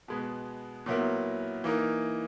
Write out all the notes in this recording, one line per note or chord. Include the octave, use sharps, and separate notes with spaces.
B2 G#3 B3
A#2 F#3 B3 E4 A#4
E3 A#3 D#4 A#4